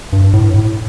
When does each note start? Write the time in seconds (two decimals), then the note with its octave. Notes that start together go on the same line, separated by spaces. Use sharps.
0.13 G2
0.33 A2
0.54 A2